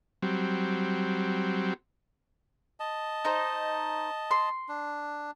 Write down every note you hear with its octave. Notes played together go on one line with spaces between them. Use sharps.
F#3 G3 C4
D#5 A5
D#4 C5
C6
D4